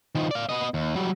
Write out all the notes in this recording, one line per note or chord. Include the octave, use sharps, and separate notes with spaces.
D#3 F3
D5 F5
B3 D#5
D#2
F#3 G3